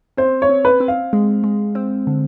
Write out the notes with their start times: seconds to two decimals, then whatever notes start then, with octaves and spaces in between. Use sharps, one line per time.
0.17 C4 C5
0.42 C#5
0.49 C4
0.65 B4
0.80 C4
0.88 F5
1.13 G#3
1.44 G#3
1.75 C4
2.07 D3